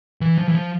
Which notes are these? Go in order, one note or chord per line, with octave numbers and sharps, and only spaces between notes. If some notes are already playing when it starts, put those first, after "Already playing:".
E3
F3
E3
F3